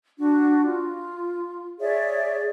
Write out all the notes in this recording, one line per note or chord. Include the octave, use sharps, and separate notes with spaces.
D4 F#4
F4
G#4 C#5 D5 E5